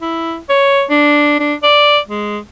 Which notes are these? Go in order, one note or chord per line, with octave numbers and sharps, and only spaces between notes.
E4
C#5
D4
D4
D5
G#3